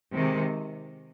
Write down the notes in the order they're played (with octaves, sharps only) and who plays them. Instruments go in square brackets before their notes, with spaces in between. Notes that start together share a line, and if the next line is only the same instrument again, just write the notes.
[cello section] C3 D#3 G#3